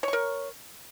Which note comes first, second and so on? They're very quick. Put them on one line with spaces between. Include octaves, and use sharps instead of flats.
C#5 C#6 A#4